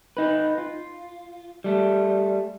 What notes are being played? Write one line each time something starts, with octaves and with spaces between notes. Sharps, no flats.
D#4 B4
F4
G3 A3